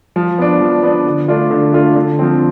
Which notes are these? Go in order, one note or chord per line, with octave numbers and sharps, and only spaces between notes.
F3
B3 D4
F3
B3 D4
D3
A3 D4 F4
D3
A3 D4 F4
D3
F3 C4